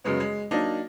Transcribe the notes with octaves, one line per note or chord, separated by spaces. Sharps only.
F#2 C#3 G#3 B3
G#3
F#3 A#3 D4 D#4